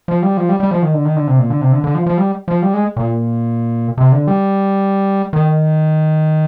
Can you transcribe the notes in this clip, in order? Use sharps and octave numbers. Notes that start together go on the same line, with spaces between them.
F3
G3
F3
G3
G3
F3
D#3
D3
D#3
D3
C3
A#2
D3
C3
D3
D3
F3
F3
G3
F3
G3
G#3
A#2
C3
D3
G3
D#3